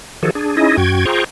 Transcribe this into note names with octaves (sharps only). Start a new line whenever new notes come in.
D#3 F3 F#4 G#4 A4
D4 G#4
C#4 D#4 E4 G#4 D#5
F#2 F#4 G5 G#6
F4 G#4 C5 G5 A#5 C#6